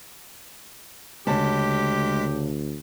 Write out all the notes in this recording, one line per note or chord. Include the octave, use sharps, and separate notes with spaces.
D2 C#3 G#3 G4 A5 B6